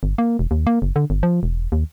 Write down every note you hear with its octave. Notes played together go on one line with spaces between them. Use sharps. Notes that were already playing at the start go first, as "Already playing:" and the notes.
G1
A#3
E1
D#2
A#3
F#1
D3
G1
F3
E1
D#2